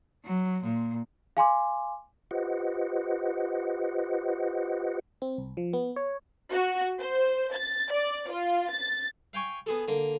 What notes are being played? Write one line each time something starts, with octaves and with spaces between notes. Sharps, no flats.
F#3
A#2
F5 G#5 C6 D6
F4 G4 B4 C5 D#5 F#5
C4
C2
F3
B3
C#5
F#4
C5
A6
D5
F4
A6
F5 G5 G#5 C#6
B3 G#4 A4
D3 A#3